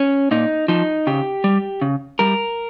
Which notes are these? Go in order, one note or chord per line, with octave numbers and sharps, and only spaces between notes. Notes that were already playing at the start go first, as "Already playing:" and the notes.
Already playing: C#4
A#2 D#4
F3 D#4
C#3 G4
G3
C#3
G3 A#4